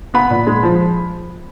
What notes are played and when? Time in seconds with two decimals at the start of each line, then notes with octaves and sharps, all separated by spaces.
0.14 B3 B5
0.30 A#2
0.47 G#3
0.63 F3